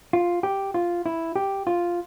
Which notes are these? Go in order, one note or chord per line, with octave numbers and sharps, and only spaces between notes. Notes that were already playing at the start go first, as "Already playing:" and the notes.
F4
G4
F4
E4
G4
F4